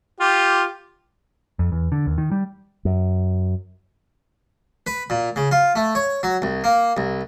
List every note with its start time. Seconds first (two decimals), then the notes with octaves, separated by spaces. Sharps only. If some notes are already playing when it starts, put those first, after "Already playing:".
0.20 F4 G4
1.59 F2
1.72 E2
1.92 D3
2.07 D#2
2.18 D#3
2.32 G3
2.85 F#2
4.87 B4
5.10 A#2
5.36 C#3
5.51 F4
5.76 A3
5.95 C#5
6.23 F#3
6.42 C2
6.64 A#3
6.97 C2